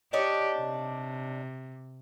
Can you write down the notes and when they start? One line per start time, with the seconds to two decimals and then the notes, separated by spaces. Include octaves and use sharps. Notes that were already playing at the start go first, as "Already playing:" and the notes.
0.13 D4 D#4 G4 C#5
0.57 C3